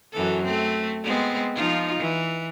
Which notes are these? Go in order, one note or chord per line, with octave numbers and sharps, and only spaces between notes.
F#2 E3 A4
A3 C4
G#3 B3 C4
F3 D#4 F4
E3